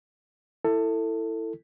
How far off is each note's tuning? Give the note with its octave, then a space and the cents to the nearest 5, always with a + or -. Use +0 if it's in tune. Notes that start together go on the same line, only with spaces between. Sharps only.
E4 +0 A4 +20